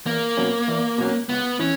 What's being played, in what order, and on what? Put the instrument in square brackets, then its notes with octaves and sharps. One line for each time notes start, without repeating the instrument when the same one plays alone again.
[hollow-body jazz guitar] E2 [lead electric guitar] A#3
[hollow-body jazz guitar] B2 F#3 C#4
E2
B2 F#3 C#4
[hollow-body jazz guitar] C#2 [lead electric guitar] B3
[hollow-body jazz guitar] E3 [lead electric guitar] C#4